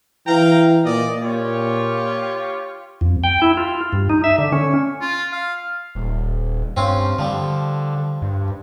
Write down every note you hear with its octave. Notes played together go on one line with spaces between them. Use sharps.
E3 F5 G5 A#5
A#2 D5 D#5
A#2 F4 G4 C#5
F2
G5
E4
F4
G2
D#4
E5
D3
C#4
F4
F5
D#1
G2 C4 C#4 F4
D3 F3 G3
G2